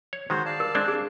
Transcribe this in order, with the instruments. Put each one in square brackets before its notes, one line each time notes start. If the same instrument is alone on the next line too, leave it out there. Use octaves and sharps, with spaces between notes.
[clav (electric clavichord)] C#5
[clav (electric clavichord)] D#3 G#3 [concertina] F#4 C5
[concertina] D5 F5 A5
[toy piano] A#4
[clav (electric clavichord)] G#3 C4 D4
[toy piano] G#4